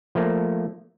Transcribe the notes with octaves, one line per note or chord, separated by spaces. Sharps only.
F3 A3 A#3